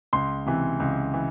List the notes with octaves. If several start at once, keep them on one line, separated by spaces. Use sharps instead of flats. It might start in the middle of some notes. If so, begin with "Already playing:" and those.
C#2 C6
C3 E3
C#2
E3